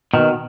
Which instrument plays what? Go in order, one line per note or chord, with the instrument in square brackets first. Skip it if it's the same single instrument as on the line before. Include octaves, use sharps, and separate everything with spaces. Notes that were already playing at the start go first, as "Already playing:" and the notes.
[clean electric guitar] B2 D#3